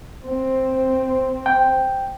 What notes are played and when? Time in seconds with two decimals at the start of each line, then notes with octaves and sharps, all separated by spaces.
0.24 C4
1.46 G5